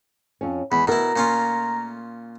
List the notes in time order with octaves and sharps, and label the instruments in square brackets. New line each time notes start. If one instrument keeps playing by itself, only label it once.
[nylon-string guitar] F2 C#4
[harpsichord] E2 [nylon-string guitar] G#3 [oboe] B5
[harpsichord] B2 E4 [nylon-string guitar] A3 A#4 [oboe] A#5
[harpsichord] A#2 C#4 F4